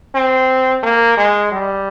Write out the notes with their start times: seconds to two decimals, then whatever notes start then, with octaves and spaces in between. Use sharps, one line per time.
0.15 C4
0.83 A#3
1.17 G#3
1.52 G3